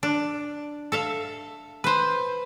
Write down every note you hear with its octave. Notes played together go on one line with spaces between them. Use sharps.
D4
A4 E5 F5
B4 C5